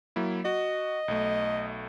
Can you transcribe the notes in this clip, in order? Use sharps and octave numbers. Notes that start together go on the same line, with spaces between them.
F#3 A#3 E4
F#4 D#5
B1 A3